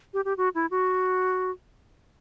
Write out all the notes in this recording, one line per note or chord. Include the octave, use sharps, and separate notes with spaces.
G4
G4
F#4
E4
F#4